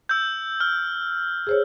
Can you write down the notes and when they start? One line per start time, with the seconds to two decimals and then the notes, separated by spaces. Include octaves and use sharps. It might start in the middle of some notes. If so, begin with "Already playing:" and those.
0.09 E6 G6
0.60 F6
1.47 G#4 C5 C#5